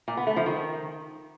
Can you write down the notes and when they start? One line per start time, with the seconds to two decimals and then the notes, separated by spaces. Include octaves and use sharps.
0.08 A#2
0.17 B3
0.27 A3
0.36 F3
0.46 D#3